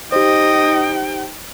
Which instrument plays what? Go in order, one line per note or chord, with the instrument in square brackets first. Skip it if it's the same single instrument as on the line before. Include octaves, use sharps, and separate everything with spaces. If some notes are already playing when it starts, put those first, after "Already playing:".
[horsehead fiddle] D#4 G5 [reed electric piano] G4 C5 [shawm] D#5